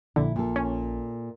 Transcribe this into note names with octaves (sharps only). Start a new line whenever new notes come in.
A#1 D3 E4
A#2 A4
C#4